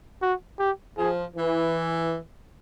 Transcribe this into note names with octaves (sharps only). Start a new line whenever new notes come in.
F#4
G4
F3 G#4
E3